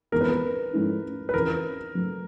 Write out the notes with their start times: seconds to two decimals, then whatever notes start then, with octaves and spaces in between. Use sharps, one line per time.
0.12 F2 C#3 E3 G#3 B3 A#4
0.21 B4
0.30 A#4
0.73 G#2 F3 A3 C#4 E4
1.29 B4
1.33 F2 C#3 E3 A#4
1.95 C#3 F#3 A3